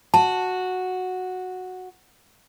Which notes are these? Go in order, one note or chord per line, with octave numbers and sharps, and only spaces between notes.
F#4 A5